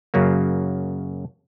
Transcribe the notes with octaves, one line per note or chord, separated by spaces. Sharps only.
F#2 C#3 F#3 A#3